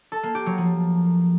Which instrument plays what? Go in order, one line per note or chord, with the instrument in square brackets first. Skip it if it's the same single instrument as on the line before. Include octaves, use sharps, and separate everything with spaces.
[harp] A4
A#3
G4
F#3
F3